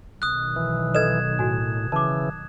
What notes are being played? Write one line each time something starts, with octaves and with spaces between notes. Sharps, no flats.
B1 D#3 D#6 F#6
E3
A4 B4 D#5 G#6 E7
A2 F#4 G#5
C#3 E3 A5 D6